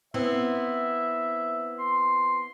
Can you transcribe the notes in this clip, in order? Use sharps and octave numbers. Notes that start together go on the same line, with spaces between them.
B3 C4 E4 E5
C6